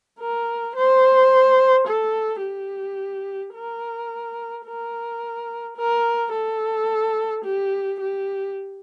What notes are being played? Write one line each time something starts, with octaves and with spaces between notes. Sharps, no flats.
A#4
C5
A4
G4
A#4
A#4
A#4
A4
G4
G4